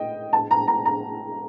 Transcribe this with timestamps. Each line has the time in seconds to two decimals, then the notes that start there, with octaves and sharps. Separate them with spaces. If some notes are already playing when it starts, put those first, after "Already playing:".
Already playing: D#5 G5
0.33 A5
0.51 A#5
0.68 A#5
0.86 A#5